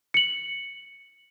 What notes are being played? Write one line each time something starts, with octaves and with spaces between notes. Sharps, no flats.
C#7 F#7